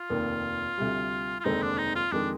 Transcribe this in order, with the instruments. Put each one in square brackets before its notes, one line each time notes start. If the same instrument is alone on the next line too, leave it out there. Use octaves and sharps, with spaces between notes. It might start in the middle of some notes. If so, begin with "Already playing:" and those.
Already playing: [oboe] F4
[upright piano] F1 D#2 D#3
D2 C3 G3
[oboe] F4
[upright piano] F1 D#2 D3 G#3 C4 [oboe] D#4
[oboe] D4
D#4
F4
[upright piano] F2 D#3 G#3 [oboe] D4